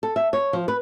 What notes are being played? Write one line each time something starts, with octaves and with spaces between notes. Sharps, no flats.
A4
E5
C#5
F3
B4